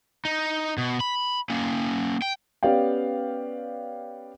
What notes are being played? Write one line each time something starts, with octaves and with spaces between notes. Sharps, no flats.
D#4
B2
B5
A#3 C#4
G5
B3 C#4 G4 D5 F5 G5